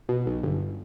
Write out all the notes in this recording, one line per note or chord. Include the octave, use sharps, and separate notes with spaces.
B2
B1
G1